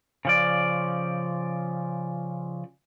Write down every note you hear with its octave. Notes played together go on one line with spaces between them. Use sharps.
C#3 F3 D5